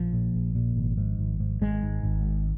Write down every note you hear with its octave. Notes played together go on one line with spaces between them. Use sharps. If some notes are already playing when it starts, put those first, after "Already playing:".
Already playing: A#1 F3
A#2
A#1
A#2
G#1
G#2
G#1
G#2
G#1 G#3
G#2
G#1
G#2